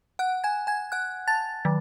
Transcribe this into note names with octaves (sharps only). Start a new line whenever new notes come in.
F#5 F#6
G#5 G#6
G#5 G#6
F#5 F#6
A5 A6
D#3 F#3